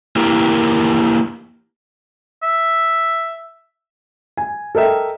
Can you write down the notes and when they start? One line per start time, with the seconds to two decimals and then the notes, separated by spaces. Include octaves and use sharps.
0.16 A#3 E4 G4 A#4
2.43 E5
4.37 G#5
4.75 A4 A#4 D#5 E5 G5